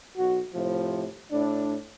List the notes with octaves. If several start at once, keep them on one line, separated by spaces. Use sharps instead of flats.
B1 F#4
A2 C3 F3
A2 D4